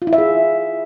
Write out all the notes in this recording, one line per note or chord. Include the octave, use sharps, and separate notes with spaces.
F4
E4
E5
G#4